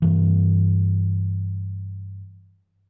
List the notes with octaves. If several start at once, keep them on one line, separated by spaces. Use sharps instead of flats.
G2 E3